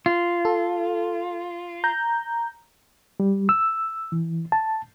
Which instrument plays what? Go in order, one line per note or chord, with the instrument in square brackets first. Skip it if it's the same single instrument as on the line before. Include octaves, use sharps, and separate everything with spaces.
[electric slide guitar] F4
[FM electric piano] A4
A#5 G6
[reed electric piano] G3
E6
E3
A5